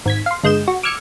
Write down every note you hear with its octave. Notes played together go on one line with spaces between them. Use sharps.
G#1 G#6 B6
F5 C6
G1 G#3 G6 E7
F#4
D6 E6 F6 G#6 C#7